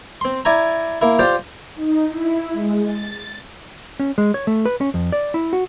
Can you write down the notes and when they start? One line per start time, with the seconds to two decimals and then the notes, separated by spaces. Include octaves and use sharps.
0.21 C4 C6
0.45 E4 D5 G#5 A#5
1.01 A#3 E4
1.19 F4 G4 C5 D5
1.75 D#4
2.09 E4
2.53 G#3
2.82 A6
4.00 C#4
4.18 G#3
4.34 C#5
4.47 A3
4.65 B4
4.81 C#4
4.94 F2
5.12 D5
5.34 E4
5.53 F#4